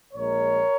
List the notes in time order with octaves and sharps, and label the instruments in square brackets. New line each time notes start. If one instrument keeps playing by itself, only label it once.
[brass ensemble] A#1 A#2 G#3 A#4 C#5